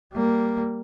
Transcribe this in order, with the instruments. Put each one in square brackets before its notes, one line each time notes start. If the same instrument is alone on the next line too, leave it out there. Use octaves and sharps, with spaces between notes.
[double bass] G3 A#3